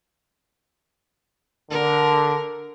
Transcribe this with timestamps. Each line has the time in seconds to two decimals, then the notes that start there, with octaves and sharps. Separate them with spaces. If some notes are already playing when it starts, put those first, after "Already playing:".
1.71 D3 A#4